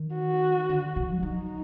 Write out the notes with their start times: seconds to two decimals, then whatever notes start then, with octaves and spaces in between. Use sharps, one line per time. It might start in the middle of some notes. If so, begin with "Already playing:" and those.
Already playing: D#3
0.15 F#4
0.69 D3
0.96 C3
1.10 F#3
1.23 F#3 D#4